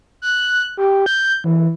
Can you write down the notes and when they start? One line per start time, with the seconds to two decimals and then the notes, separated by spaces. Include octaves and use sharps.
0.22 F#6
0.77 G4
1.06 G6
1.44 E3